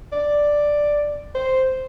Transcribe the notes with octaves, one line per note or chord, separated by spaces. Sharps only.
D5
C5